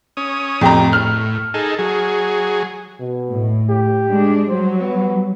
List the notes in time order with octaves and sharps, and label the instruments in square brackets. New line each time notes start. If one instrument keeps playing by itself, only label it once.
[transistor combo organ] C#4 D#6
[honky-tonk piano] F2 G4 A#5 [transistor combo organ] A2
[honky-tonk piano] F6
[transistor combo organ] D#4 G#4 A4
F#3 G#4
[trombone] B2
[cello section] A2
[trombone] G4
[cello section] G#3 D4
[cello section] F#3 G3 [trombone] C5
[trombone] B3